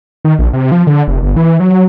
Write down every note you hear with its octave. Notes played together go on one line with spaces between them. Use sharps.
D#3
A#1
C3
F3
D3
F1
G1
E3
F#3